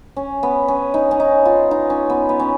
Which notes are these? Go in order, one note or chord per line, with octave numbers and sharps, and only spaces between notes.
C#4
B3
C#4
D#4
C#4
D#4
F4
D#4
C#4
B3
B3
C#4